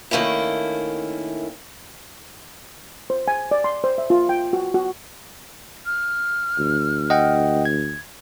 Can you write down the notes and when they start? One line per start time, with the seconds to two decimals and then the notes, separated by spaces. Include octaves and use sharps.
0.11 D#3 A3 A#3 C#4 E4
3.10 C5
3.28 G#5
3.51 D5
3.64 C6
3.84 C5
3.98 E5
4.10 F4
4.29 G5
4.53 F#4
4.74 F#4
5.86 F6
6.59 D2
7.10 D#5 F#5 G5
7.65 G#6